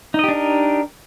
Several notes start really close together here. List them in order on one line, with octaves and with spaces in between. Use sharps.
D#4 D#5 G4 D4 A#4